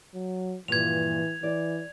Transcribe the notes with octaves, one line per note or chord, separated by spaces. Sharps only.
F#3
G2 A#2 E3 F3 G#6 F7
E3 D5